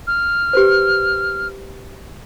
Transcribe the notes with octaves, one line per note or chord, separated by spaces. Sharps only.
F6
G4 B4 C5